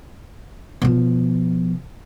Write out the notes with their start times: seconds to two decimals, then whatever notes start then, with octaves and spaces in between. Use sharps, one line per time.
0.82 B2 F3